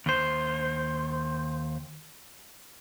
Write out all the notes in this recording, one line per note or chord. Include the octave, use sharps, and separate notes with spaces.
D#2 C5